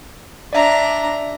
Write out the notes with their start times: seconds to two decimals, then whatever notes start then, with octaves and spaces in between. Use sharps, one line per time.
0.53 D4 D5 E5 A#5